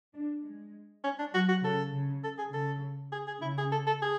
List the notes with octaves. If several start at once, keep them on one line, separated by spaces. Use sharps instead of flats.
D4
G#3
C#4
D4
F#3 F#4
F#4
C#3 A4
C#3
A4
G#4
C#3 A4
G#4
G#4
C#3 E4
G#4
A4
A4
G#4